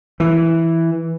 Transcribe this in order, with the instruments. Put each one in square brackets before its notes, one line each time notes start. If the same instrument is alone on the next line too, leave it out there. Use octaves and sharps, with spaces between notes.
[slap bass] E3